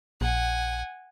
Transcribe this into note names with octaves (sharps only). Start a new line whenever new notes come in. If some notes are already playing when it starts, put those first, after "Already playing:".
A#1 F#5 G#5